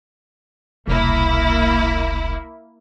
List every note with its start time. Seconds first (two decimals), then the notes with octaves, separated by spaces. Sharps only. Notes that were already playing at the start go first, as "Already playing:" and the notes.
0.88 E1 C2 A#3 E4